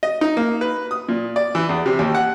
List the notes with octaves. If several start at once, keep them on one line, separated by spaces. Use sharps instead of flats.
D#5
D#4
A#3
B4
D#6
A#2
D5
E3
E2
C3
D#2
F#5